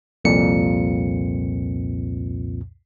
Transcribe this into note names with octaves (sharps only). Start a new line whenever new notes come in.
C2 F2 A#2 C#7